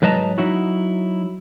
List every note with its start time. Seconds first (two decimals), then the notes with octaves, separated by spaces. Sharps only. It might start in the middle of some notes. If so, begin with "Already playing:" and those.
0.02 G#2 F#3 B4 D#5 A5 A#5
0.38 F#3 D#4 E4 F#4